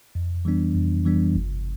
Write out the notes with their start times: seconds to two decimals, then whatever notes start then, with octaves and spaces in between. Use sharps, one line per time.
0.15 F2
0.45 E3 G3 B3 D4
0.75 F2
1.05 E3 G3 B3 D4
1.35 G1